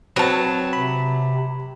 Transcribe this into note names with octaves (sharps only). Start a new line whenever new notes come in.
F#3 C4 B4 A5
C3 B5